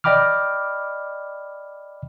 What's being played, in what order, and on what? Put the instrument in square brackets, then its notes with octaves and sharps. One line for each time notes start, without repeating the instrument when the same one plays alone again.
[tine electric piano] D5 D#5 G5 B5 D6 F6